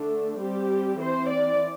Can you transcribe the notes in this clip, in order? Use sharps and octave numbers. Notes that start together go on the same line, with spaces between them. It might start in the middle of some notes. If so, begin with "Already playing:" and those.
Already playing: D3 A3 D4
G3 C4 G4
E3 C4 C5
D5